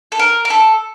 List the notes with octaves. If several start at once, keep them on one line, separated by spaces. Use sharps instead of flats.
A4
A#4
A#4
A4